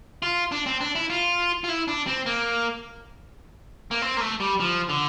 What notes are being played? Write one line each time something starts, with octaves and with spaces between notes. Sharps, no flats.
F4
D4
C4
D4
E4
F4
F4
E4
D4
C4
A#3
A#3
C4
A#3
A3
G3
F3
D3